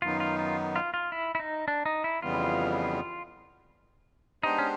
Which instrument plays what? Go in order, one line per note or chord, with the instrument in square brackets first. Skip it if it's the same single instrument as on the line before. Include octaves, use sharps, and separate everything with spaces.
[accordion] F#2 D#3 F#3 B3 D#4 [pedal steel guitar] F4
[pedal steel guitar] F4
F4
F4
F4
E4
E4
D#4
D4
D#4
E4
[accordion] F2 C#3 E3 G3 B3 [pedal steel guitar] F4
[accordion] G#3 B3 D4 G4 C5 [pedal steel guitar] D#4
[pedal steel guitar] C#4